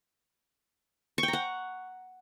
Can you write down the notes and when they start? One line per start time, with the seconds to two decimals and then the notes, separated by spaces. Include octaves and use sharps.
1.18 C#6
1.23 G5
1.28 A#5
1.33 F#5